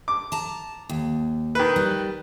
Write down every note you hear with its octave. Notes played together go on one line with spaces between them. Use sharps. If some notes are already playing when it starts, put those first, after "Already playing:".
D6
A5 A#5
D#2
D#3 B4
G3